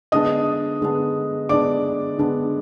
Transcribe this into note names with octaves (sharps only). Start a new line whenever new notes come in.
D3 G#3 B3 D4 D#5 D#6
D3 G#3 B3 D4
D3 G#3 B3 D4 D5 D6
D3 G#3 B3 D4